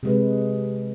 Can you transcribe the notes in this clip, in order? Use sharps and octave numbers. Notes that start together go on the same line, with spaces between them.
C3 G#3 B4